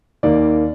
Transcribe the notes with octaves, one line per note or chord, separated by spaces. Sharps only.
D#2 D#3 A#3 D5